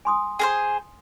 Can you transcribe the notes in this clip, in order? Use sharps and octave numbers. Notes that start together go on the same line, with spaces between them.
G#5 C6 D#6
G#4 A#4 C5